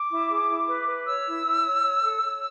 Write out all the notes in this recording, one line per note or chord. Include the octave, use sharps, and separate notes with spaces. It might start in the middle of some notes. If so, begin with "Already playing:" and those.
Already playing: D6
E4
G#4
E4
B4
B4
C#5 E6
E4
E4
C#5
C#5
A4
C#5